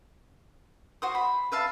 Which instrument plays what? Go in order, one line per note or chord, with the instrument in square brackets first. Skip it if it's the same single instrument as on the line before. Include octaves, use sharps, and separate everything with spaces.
[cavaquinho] F#4 C5 D#6
B5
B4 E5 F5 A5